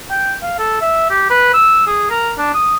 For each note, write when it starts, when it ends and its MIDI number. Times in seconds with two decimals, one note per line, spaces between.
0.10 0.34 79
0.42 0.58 77
0.59 0.81 69
0.81 1.06 76
1.10 1.26 67
1.30 1.50 71
1.53 1.82 88
1.87 2.06 68
2.10 2.32 70
2.38 2.52 62
2.54 2.77 87